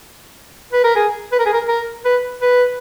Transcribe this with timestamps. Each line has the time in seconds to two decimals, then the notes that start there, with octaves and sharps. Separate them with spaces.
0.72 B4
0.84 A#4
0.95 G#4
1.32 B4
1.39 A#4
1.46 G#4
1.53 A#4
1.68 A#4
2.05 B4
2.41 B4